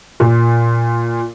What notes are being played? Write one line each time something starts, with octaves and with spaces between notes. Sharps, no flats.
A#2